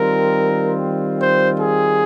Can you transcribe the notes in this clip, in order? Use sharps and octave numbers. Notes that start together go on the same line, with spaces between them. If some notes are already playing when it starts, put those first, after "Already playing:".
Already playing: D#3 G3 C4 F4 A#4
C5
G#4